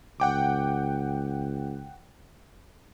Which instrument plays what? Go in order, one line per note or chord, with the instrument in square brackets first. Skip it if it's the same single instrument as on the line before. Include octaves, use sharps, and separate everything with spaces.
[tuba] C#2 [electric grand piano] F#5 G5 D6